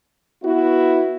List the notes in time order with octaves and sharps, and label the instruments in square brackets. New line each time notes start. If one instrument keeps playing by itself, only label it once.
[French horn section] B3 E4 F#4